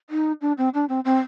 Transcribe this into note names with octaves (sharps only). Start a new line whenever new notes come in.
D#4
D4
C4
D4
C4
C4